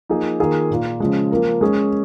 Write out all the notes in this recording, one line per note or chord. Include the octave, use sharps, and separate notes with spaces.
F3 A#3 D#4 G#4
D#3 A#3 F4 G#4
A#2 A#3 F4
C#3 F3 G#3
F3 A#3 F4 A#4
G#3 C#4 G#4